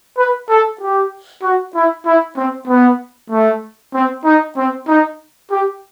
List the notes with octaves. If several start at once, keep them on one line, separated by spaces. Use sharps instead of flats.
B4
A4
G4
F#4
E4
E4
C4
B3
A3
C4
D#4
C4
D#4
G4